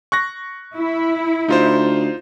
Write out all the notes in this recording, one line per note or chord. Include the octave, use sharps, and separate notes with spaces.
C#6 F#6 A#6
E4
D2 D#4 F4 C5